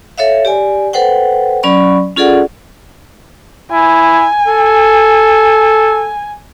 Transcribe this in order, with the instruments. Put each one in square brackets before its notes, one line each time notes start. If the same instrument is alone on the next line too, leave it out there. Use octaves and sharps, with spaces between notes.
[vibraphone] A4 C#5 E5 F5
G4 D5 G#5
A4 B4 C5 F#5 G5
F#3 C#4 D5 B5 C#6
C#4 F4 G#4 A4 D5 F#5
[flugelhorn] E4 [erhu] G#5
[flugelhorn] A4